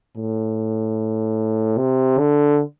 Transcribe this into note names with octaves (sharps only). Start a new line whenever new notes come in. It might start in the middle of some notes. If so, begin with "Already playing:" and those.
A2
C3
D3